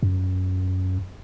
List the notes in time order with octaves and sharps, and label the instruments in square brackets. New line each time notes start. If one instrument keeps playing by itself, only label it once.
[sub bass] F#2